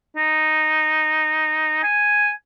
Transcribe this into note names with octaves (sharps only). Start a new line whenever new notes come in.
D#4
G#5